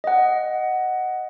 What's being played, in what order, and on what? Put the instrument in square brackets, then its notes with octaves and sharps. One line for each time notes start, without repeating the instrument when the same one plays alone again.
[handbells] D#5 F#5